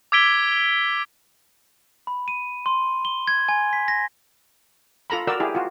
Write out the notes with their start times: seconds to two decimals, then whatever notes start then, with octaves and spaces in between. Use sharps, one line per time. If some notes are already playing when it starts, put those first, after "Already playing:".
0.12 D6 E6 G#6 B6 D7 G7
2.07 B5
2.28 D#7
2.66 C6
3.05 G7
3.28 G#6
3.49 G#5
3.73 B6
3.88 A#6
5.10 F4 A4 A#5 B5
5.27 F#4 A#4 D5 E6
5.40 E4 G4 G#4
5.55 F4 F#4